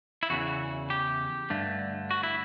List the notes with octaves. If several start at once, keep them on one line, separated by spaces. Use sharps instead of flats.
E4
E2 C#3 E3 F#4
G4
G2 D3 A3
F#4
E4